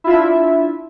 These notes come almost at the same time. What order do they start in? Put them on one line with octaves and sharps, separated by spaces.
E4 F4 E5 D4